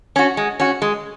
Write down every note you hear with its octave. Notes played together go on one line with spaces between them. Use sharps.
C#4 F#4
G#3
C#4 F#4
G#3